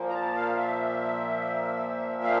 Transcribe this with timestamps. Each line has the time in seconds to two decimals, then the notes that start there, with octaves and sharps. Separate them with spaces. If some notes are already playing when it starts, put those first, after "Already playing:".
Already playing: A#2 F3 A#3
0.09 A#5
0.14 A5
0.35 F5
0.56 E5
2.23 F5